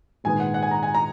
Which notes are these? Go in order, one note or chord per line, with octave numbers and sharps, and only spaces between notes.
A#1 G#2 D#3 G#3 B3 G#5
F#5
F#5
G#5
A#5
G#5
A#5